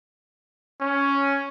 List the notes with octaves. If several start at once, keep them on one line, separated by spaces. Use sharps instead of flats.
C#4